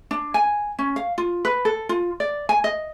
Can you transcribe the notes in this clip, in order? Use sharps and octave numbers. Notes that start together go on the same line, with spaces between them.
D4
G#5
C#4
F5
F4
B4
A4
F4
D5
G#5
D#5